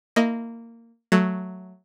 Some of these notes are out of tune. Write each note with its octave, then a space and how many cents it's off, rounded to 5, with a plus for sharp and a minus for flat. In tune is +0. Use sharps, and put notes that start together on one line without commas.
A#3 -15 E4 +0 D#5 +0
F#3 +0 A3 +0